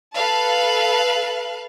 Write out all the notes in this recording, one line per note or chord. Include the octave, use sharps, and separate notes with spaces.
A4 B4 F5 A5 F#6